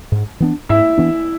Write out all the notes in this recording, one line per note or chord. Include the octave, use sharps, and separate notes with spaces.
G#2
E3 B3 D4
G#2 E4 E5
E3 B3 D4